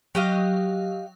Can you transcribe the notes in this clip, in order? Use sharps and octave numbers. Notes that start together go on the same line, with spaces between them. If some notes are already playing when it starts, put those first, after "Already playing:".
F#3 G4 D#5 F5